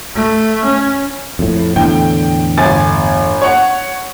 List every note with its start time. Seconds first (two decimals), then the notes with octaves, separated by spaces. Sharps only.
0.15 A3
0.65 C#4
1.39 F2 A2
1.76 E2 A2 D3 G5
2.58 G1 G#5 A6
3.42 C#5 F#5